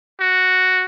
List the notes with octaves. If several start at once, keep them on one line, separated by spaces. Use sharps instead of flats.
F#4